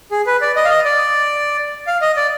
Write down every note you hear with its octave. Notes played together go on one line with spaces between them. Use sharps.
G#4
B4
D5
D#5
F5
D#5
D5
F5
D#5
D5